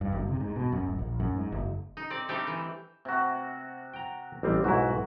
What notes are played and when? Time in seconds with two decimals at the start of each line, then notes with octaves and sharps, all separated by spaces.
0.01 G2
0.12 F#1
0.28 C3
0.40 G#2
0.56 B2
0.72 F#2
0.86 D1
0.99 A#1
1.20 F#2
1.35 G#2
1.52 F#1
1.97 D#4
2.10 C4 D5
2.29 G3 A3 C4 D4 D#4 G4
2.47 E3
3.05 C3 F#4
3.94 G5 A#5
4.43 A1 G3 C4
4.64 B1 G#2 E4 F#4